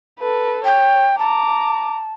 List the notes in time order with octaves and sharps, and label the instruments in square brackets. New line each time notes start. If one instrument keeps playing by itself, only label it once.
[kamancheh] A4 B4
[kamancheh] C#5 [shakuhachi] G5
[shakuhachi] A5 [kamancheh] A#5 D6